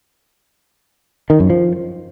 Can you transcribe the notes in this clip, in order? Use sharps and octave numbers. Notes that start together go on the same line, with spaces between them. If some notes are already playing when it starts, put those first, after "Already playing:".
D#3
F#2
F3